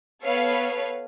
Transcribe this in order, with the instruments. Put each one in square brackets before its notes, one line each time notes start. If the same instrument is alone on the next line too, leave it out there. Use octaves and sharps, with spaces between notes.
[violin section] B3 A4 B4 C#5 F5